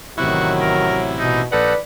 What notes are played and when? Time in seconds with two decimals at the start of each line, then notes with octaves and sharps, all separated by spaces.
0.18 A1 C3 D#3 F#3 E4 F#4
0.60 A#4
1.18 B2 D#4
1.52 A#1 D#4 A4 B4 D5 F#5